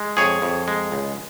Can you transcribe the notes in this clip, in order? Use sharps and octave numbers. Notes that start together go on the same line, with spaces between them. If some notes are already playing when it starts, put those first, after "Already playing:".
Already playing: G#3
F2 G#4 C#5
F2
G#3
C#2